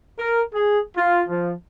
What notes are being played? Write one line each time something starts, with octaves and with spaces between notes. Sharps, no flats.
A#4
G#4
F4
F3